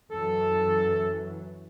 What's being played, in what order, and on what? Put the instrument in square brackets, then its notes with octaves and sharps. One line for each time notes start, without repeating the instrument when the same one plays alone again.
[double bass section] F#2 E3 F#3 [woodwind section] A4